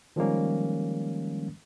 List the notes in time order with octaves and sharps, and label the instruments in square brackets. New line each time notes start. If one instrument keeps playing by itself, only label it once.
[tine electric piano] D#3 F3 G3 G#3 A#3 C#4